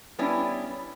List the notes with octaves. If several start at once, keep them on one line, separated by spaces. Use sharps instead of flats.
G3 B3 C#4 D4 E4